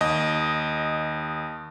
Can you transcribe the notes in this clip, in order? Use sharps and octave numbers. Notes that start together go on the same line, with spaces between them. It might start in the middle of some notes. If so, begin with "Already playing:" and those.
D#2 D#5